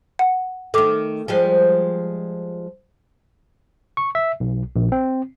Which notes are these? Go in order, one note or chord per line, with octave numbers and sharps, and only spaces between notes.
F#5
D#3 A3 A4 D6
F3 G3 G#3
C#6
E5
B1
A#1
C4